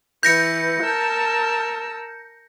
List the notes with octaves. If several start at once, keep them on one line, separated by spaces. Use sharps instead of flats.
E3 B4 G6 A#6 C#7
A#4 A5 E6